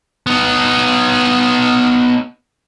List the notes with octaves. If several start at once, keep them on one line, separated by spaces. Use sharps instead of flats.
B3 D#4